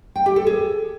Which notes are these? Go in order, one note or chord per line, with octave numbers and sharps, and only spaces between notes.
G5
G4
A4
G#4